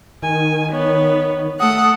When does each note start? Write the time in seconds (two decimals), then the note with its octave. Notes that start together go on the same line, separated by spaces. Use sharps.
0.23 D#3 G#5
0.72 B3 C#5
1.60 A3 A4 F#5 D#6